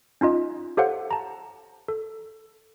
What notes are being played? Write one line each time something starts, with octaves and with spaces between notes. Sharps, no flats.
C#4 D#4 F4 D#5
G4 A4 C5 C#5 F5 F#5
A5 A#5
A4